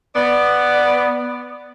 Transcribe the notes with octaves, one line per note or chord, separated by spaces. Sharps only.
B3 D5